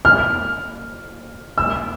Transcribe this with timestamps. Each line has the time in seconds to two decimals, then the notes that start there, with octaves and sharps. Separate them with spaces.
0.05 F6
1.58 E6